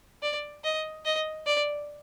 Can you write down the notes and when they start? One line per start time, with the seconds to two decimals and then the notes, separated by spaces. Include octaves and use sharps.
0.22 D5
0.64 D#5
1.05 D#5
1.46 D5